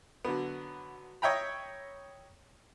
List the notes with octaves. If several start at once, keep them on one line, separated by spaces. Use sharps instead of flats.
D3 F#3 B3
C#5 D#5 E5 G5 A#5 B5